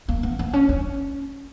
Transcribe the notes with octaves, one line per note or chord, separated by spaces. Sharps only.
A#3
B3
B3
C#4
C#4